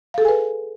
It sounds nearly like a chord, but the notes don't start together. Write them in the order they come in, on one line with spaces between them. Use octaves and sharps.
F5 A4 G#4 G#5 B4